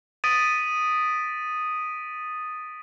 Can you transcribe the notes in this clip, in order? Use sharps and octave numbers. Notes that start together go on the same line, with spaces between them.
D#6 A6 B6 D7 D#7